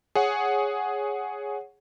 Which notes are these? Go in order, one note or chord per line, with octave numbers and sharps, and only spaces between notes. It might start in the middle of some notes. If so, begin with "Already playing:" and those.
G#4 C#5 F#5